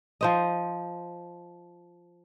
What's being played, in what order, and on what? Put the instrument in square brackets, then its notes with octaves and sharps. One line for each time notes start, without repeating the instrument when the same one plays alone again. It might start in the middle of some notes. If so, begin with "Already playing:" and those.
[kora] F3 C5 D#5